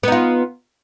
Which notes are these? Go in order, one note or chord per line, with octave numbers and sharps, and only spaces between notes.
B3 D#4 F4